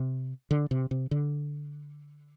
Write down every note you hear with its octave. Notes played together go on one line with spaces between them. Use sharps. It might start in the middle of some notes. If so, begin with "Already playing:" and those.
Already playing: C3
D3
C3
C3
D3